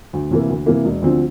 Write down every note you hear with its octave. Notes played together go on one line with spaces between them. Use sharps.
D2
C3 E3 A#3
D2
C3 E3 A#3
E1
D2 D3 F3 C4